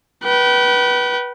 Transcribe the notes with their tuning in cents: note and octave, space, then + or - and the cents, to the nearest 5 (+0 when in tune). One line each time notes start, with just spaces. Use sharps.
B4 -20 G5 -40